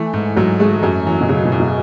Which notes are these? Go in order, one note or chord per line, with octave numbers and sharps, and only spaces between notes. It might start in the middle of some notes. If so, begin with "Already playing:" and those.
Already playing: E3 A3
G#2
G#2 F#3
G#3 A3
F#2 F#3
E3 F#3
B2
C#3 F#3
B2
F#2
B2